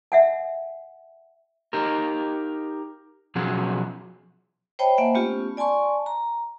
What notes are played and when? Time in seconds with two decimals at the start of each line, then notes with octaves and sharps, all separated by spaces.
0.12 E5 F#5 G#5
1.73 D#4 G4 A#4
3.35 B2 F3 F#3 C#4 F#4 G#4
4.79 C5 C#5 D#5 G5 A5 B5
4.98 A#3 C5 E5 F#5 G#5
5.15 A3 B3 C#4 F4 G4
5.57 D5 G#5 A5 C6 C#6
6.06 A#5